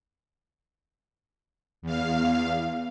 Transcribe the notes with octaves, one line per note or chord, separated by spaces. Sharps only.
E2 F5